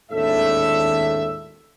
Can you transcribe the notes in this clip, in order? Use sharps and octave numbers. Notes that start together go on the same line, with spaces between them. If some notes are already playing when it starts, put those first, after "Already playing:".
G#1 D#2 A2 D4 A4 E5